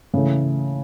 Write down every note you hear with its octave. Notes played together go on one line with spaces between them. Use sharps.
C#3 E3 A3